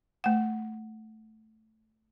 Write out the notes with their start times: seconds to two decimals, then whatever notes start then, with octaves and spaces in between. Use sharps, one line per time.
0.24 A3 F#5